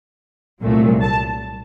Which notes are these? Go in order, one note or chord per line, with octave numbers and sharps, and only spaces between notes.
C2 A#2 F#3 A3
A5